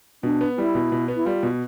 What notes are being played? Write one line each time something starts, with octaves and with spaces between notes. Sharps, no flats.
B2 D4
B3
G3 E4
B2
B2
B3
E4
G3 F4
B2